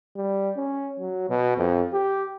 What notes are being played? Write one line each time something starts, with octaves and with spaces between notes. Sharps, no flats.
G3
C#4
F#3
B2
F2
G4